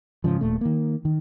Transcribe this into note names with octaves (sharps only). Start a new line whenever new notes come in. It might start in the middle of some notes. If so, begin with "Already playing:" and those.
G#2 C#3 F3
D#1 A#2 A3
D#3 A#3
D#3